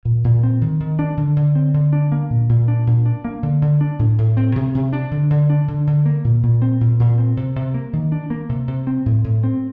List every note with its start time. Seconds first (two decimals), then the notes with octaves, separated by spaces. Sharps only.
0.05 A#2
0.24 A#2
0.43 C4
0.61 D#3
0.80 D#3
0.99 D4
1.17 D3
1.37 D3
1.55 C4
1.74 D3
1.93 D4
2.12 A#3
2.30 A#2
2.49 A#2
2.68 D4
2.87 A#2
3.06 D4
3.25 A#3
3.43 D3
3.62 D3
3.81 D4
3.99 A2
4.18 A2
4.37 C4
4.56 C3
4.74 C3
4.93 D4
5.11 D3
5.30 D3
5.50 D4
5.68 D3
5.87 D3
6.06 A#3
6.24 A#2
6.43 A#2
6.62 C4
6.81 A#2
6.99 A#2
7.18 C4
7.37 C3
7.56 C3
7.74 A#3
7.93 D#3
8.12 D4
8.30 A#3
8.49 C3
8.68 C3
8.87 C4
9.06 A2
9.24 A2
9.44 C4